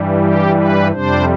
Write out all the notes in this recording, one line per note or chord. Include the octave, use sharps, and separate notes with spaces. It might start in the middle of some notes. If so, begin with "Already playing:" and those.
Already playing: G2 E3 G3
G4
B4
F2 C3 G3 D4 C5